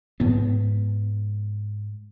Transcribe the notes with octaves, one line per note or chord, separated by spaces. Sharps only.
G#2 B3